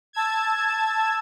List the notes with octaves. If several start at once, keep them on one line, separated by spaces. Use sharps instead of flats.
A5 E6 G#6